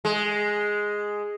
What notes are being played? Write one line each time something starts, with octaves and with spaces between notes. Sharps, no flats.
G#3